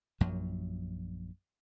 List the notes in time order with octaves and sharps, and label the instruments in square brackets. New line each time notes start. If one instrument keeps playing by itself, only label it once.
[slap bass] A#1 F#2 F3 F#3